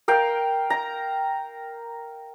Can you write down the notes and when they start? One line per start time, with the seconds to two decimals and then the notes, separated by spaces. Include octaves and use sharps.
0.08 A#4 F5 G5
0.70 A#5